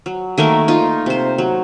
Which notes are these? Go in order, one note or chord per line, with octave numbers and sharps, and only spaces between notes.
F#3
D#3 A3 A#3 A#4
D#4 F4
C3 C5
F#3